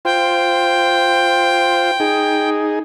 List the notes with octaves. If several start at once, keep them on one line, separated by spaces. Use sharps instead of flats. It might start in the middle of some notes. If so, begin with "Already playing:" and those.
F4 C5 G5
D#4 G#4